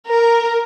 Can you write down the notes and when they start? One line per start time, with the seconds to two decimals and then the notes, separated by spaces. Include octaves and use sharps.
0.11 A#4